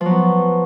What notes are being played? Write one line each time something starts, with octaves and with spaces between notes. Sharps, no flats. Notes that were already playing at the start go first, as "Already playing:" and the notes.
F3 F#3 B3